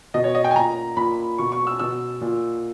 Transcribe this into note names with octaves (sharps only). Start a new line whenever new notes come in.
B2 D#5
C#5
D#5
G5
G#5
A#2 A#5
A#2 B5
B2 C#6
C#6
E6
B2 E6
A#2